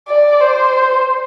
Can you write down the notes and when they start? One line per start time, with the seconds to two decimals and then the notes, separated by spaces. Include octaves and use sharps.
0.08 D5
0.41 C5